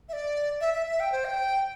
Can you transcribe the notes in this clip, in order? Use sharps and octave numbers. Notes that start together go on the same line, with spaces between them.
E5
D5
E5
E5
E5
G5
C5
G5